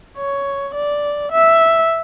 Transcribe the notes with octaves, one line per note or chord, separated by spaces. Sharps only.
C#5
D5
E5